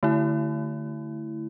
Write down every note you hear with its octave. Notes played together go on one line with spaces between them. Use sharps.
D3 A3 E4